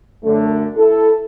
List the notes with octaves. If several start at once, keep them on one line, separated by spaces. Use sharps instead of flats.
F#2 D3 A3
E4 A4